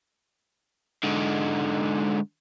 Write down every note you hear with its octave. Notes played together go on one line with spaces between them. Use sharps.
G#2 D3